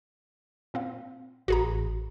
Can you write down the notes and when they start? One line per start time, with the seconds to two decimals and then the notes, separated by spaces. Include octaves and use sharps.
0.74 A#2 C4 F5
1.48 A1 F#4 G#4 A#5